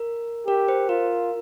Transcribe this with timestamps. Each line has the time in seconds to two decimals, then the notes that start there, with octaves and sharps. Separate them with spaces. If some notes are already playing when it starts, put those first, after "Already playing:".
Already playing: A#4
0.47 G4 A#4
0.68 C5
0.89 F4 A#4